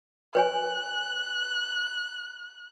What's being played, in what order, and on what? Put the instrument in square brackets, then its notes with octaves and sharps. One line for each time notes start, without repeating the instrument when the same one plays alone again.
[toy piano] B4 C#5 G#5 [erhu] F#6